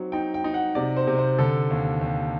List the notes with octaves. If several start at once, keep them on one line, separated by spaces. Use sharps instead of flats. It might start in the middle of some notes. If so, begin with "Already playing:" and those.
Already playing: F#3 C4 D#4
D#4 G5
G5
D#4
F#5
C3 D5
C5
C3
C5
D3 A4
D#2
D#2